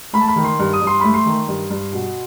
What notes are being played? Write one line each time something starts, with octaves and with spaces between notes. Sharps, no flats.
A3 B5
A5
B5
D#3
C6
G2
D#6
G2
C6
A3 B5
C6
D#3
G2
G2
B2